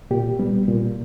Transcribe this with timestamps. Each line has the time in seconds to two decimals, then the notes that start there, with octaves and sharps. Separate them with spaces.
0.11 A#2 G4
0.39 G3 B3
0.68 A#2